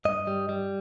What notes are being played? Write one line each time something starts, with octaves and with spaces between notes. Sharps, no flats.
G2 D#5
G3
G3